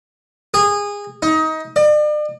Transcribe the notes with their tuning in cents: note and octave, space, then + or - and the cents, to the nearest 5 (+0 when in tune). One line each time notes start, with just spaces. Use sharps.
G#4 -25
D#4 +25
D5 +40